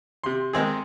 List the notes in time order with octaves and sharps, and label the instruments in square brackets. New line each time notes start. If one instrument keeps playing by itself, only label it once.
[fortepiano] C3 C6
D#3 G#3 C4 G#4